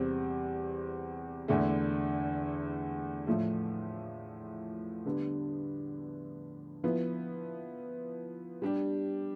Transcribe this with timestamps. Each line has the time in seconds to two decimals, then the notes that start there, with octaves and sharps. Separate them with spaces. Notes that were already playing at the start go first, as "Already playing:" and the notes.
Already playing: E2 C3 G3 C4
1.48 E2 D3 A3
3.27 A2 F3 A3
5.06 D3 G3 B3 D4
6.84 F3 B3 E4
8.62 G3 D4 G4